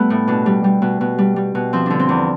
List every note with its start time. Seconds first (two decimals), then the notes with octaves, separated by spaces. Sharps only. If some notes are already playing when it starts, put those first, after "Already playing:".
Already playing: G3 A3 B3
0.10 A2
0.28 B2 D4
0.46 G3
0.64 G3
0.82 B2
1.01 B2
1.18 G3
1.36 G3
1.55 B2
1.73 F3 C4
1.86 D3 D4
1.99 C4
2.09 E2